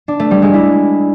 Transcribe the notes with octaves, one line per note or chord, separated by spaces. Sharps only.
D4
A3
G3
G#3
E4